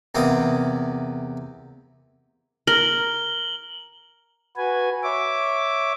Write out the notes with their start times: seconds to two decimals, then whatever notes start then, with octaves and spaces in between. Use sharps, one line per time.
0.15 E2 C3 A#3 D6 D#6
2.67 A#4 F#7 G7
4.56 F#4 B4 G#5
5.03 C#5 E5 D6